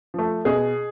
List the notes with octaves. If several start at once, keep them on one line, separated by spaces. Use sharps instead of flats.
F3 A3
B2 G#4